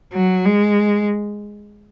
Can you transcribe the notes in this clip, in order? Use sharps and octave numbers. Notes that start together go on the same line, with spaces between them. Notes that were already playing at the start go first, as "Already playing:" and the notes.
F#3
G#3